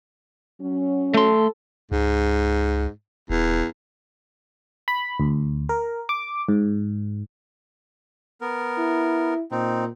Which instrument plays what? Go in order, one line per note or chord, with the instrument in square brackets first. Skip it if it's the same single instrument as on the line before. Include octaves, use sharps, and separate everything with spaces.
[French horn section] F#3 C#4
[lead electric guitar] A3 C6 [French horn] A4
[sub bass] C#2 [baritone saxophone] G#2
[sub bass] D#1 [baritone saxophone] E2
[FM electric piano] B5
D2
A#4
D6
G#2
[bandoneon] B3 A#4
[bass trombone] E4
[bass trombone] A#2 [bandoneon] C4 D#4